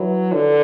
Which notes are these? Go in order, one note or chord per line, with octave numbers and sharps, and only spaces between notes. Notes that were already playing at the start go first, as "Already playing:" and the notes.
Already playing: E3 F#3
D3